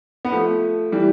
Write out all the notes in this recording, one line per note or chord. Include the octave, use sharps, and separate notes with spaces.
B3
F3 A3
E3 G3